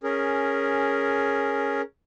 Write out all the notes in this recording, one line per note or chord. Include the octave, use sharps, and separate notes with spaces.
C#4 G#4 A#4